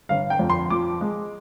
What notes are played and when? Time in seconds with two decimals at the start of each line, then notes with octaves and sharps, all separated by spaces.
0.09 G1 F5
0.30 G5
0.39 F2
0.50 C6
0.70 F3 D6
1.01 G#3